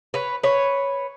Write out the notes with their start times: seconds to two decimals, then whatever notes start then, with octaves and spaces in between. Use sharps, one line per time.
0.14 B4 C#5
0.43 B4 C#5